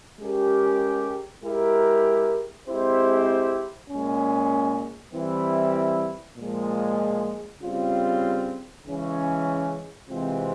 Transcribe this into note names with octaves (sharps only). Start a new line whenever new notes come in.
G#3 C#4 G4 A#4
G#3 E4 G4 A#4
G#3 C4 E4 G4 C5
A#2 G#3 C#4
E3 G3 C4 E4
A#2 F3 G#3
C#3 G3 C4 F4
C#3 E3 G#3 C#4
C3 E3 G#3 C4 F4